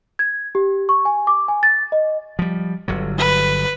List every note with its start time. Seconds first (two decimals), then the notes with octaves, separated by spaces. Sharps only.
0.19 G#6
0.55 G4
0.89 C#6
1.05 G#5
1.27 D6
1.48 G#5
1.63 A6
1.92 D#5
2.39 F3 G3
2.88 G1 D3 F#3
3.19 B4